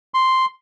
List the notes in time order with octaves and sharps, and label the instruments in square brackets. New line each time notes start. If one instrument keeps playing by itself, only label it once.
[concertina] C6